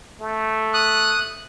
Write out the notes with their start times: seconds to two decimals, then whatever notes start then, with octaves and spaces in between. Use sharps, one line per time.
0.20 A3
0.74 D#6 F#6